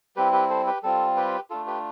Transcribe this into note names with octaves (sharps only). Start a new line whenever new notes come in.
G3 C4 E4 G4 B4
G4 B4
A4 C5
G4 B4
G3 C4 F4 A4
G4 B4
A3 D4 F4 A4
G4 B4